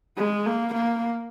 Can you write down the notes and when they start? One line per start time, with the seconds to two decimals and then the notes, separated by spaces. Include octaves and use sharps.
0.17 G#3
0.46 A#3
0.74 A#3